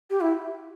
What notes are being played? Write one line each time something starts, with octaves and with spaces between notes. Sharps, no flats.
G4
E4